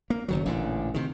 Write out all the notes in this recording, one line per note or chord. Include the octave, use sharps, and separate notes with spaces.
A#3
F#1 D#3 F#3
A1 A#2 D3
C3 D#3